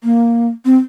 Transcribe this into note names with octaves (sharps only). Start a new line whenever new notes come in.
A#3
C4